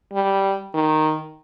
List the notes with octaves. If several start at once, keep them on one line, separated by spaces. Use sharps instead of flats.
G3
D#3